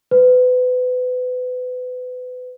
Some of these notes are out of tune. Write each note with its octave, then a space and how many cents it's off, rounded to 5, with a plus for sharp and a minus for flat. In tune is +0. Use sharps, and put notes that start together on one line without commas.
B4 +30